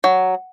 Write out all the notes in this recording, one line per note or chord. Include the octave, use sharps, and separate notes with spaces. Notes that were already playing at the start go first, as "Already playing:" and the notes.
F#3